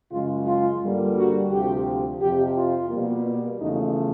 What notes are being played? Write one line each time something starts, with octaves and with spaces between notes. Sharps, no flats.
F#2 C#3 F3 G#3 F4
F4
G2 D3 G3 A#3
F#4
D2 C3 F3 G4
F2 C3 F3 G4
F4
B2 G3 A#3
E2 C#3 F3 A3 D#4